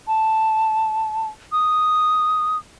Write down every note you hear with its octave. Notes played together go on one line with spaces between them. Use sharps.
A5
D#6